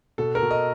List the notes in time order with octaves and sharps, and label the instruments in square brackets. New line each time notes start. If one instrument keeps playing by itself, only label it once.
[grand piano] B2 A4
A#4
B2
D#5